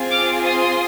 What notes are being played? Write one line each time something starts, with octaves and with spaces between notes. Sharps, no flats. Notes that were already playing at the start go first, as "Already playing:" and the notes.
Already playing: C4 F4 G#4
D6 F6
C6 D#6